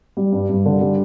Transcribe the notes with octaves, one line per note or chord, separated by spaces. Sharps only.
G3
G2
G2
D3
G3